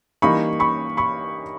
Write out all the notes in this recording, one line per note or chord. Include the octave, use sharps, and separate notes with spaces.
E3 G3 A#3 D#4 B5 C#6
B5 C#6
B5 C#6